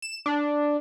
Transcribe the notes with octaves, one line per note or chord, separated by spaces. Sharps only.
E7
D4